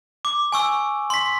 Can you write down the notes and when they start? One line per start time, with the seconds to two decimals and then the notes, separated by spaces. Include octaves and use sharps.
0.25 D6
0.52 G#5 C#6 E6
1.10 C6 B6